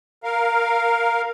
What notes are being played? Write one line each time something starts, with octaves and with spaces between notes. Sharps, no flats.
A#4 F5